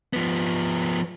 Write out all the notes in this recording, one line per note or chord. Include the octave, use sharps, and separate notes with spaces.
F3 B3